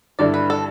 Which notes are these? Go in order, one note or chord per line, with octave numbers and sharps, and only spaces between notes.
G2 D3 G3 E4 D5
B4
A4